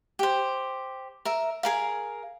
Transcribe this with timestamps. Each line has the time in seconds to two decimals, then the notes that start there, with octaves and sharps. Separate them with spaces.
0.19 G4 C5
1.25 A#4 E5
1.63 G#4 A#4 F5